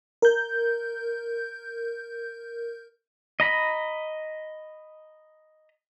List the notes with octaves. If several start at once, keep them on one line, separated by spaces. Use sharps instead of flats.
A#4 G6
D#5 A#5 B5